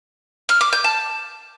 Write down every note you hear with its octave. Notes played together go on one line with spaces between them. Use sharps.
F6
D6
G6
A5